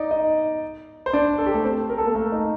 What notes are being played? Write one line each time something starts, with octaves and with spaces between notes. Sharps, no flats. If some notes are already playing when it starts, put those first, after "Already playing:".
Already playing: D#4 D5 D#5
D#4 D#5
C5
D4 D5
A4
G4
A3 A4
C4 C5
A#4
A4
A#3 A#4
A3 A4
D#4 D#5